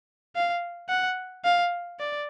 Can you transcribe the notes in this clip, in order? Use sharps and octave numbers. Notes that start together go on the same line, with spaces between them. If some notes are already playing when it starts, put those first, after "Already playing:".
F5
F#5
F5
D5